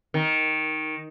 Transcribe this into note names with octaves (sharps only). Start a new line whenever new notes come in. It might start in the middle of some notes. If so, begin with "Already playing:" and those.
D#3